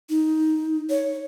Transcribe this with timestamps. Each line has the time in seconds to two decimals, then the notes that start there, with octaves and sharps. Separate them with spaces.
0.10 D#4
0.90 C#5